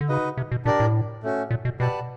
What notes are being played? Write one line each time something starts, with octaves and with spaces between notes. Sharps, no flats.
D3
C#3 D#4 F#4 B4 D#5
C3
B2
A#2 D4 G4 A#4 D5
A2
A3 C#4 F#4
A#2
B2
B2 G4 B4 D5 F#5 A5